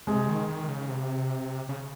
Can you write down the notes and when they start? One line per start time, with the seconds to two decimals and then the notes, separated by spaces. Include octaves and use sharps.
0.07 C3 G#3
0.28 D#3
0.48 D#3
0.68 C#3
0.89 C3
1.69 C#3